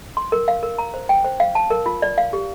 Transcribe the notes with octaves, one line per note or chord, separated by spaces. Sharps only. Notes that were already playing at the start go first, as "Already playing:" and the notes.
C6
A#4
F5
A#4
A#5
C5
G5
C5
F5
A5
A#4
F4
D5
F5
G4